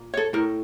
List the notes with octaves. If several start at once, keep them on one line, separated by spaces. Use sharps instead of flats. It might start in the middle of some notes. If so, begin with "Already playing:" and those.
Already playing: A#2 A#3
A4 C#5
A2 A3 A#4